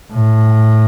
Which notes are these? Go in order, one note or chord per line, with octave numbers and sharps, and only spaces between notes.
A2